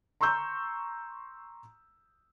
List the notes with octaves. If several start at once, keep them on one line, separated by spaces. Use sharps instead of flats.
A#5 C6 C#6 E6 G6